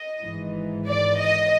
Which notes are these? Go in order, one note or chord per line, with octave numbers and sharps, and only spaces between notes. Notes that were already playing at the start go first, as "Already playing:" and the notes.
Already playing: D#5
G#1 G#2 E3
D5
D#5